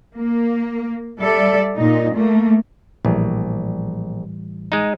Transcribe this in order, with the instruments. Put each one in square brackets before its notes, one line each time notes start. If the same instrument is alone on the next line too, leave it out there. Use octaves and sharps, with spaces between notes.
[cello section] A#3
G3 A4 D5 E5
A#2 D#4
A3 A#3
[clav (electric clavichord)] A#1 [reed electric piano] A2 E3 G3
[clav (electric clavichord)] G#3 D#4